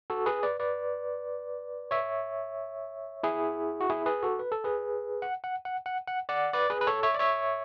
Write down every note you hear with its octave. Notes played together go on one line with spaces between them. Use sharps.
F#4 A4
G#4 B4
B4 D5
B4 D5
C#5 E5
E4 G#4
F#4
E4 G#4
G#4 B4
F#4 A4
B4
A4
G#4 B4
F#5
F#5
F#5
F#5
F#5
D5 F#5
B4 D5
G#4 B4
B4
A4 C#5
C#5 E5
D5
C#5 E5